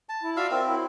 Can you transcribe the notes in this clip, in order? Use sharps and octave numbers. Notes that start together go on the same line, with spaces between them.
A5
E4
F4 F#4 D5 E5 F5
C4 A#4
F#3 E4